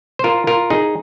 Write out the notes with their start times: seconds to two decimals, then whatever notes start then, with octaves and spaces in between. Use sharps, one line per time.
0.19 C5
0.24 F4 A#4
0.47 F4 A#4
0.70 D#4 G#4